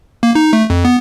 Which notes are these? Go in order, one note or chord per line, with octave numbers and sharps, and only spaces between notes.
A#3
D#4
A3
F2
B3